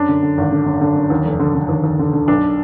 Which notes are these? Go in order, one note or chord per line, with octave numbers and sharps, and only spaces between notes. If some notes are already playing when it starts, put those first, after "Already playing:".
Already playing: F#2 D4
D3
D3
G#1
D3
F#2
D3
F#2
D#2
F1
D3
D3
D#2
D#2
D3
D3
B1 D4